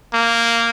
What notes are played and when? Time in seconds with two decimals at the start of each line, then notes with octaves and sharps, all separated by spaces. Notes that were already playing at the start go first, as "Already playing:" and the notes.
0.13 A#3